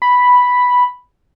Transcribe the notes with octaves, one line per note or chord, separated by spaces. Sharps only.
B5